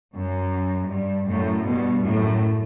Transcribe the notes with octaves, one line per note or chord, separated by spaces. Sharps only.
F#2
G2
F#2 A2
G2 B2
F#2 A2